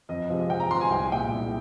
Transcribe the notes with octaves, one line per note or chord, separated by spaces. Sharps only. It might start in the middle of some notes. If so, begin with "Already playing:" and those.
F2 D#5
C3 F3 G#3
F2 G5
A#5
C3 F3 G#3 C6
G#5
C2 G5
A#2 G#3 G5
C2